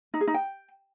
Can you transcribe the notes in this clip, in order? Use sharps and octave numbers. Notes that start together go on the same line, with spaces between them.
D#4
G#4
D#4
G5